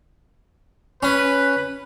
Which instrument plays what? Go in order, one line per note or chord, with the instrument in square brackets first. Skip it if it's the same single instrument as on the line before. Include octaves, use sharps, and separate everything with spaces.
[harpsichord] C#4 [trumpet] B4